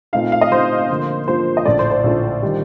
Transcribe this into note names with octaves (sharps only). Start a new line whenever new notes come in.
A#2 A3 C4 D#4 F5
F5
D#5
A#2 A3 C4 D#4 C5
D3 F3 A#3 F4
D3 F3 A#3 F4 C5
D#5
A#1 A2 A3 D5
C5
C5
A#1 A2 A3
D#3 G3